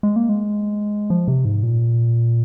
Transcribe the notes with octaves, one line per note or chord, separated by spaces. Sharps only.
G#3
A#3
G#3
F3
C3
G#2
A#2